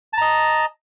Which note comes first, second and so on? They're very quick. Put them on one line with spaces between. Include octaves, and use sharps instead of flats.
A5 A#5 D#5